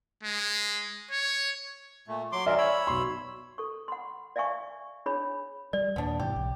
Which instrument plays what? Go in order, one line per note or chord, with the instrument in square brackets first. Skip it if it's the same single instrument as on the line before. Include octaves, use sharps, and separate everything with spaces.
[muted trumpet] G#3
C#5
[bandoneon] A#2 A3
F#3 C6 D6
[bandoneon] D#3 F#3 A#4 [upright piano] D5 E5 G#5
[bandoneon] C#5 B5 E6
[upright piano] B1 C6
[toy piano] A4 C#6
F#5 B5 C6
D5 E5 F5 G#5 C#6
D4 G#4 C#5 B5
[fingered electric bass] G3 [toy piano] D5
[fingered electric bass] D#2 A#2 [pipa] B3 D4
[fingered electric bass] G#2 C3 E3 [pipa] G4
[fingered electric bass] B1